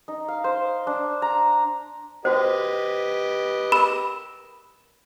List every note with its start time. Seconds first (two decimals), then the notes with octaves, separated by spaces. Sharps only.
0.08 D#4
0.28 F5
0.44 C5
0.87 D4
1.22 A#5
2.25 F#4 G4 B4 C5 D#5
3.72 A#4 B5